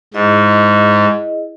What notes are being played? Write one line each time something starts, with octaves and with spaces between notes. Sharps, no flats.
G#2 E4 G#4 D#5